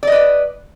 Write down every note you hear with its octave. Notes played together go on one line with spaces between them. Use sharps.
B4 D5 D#5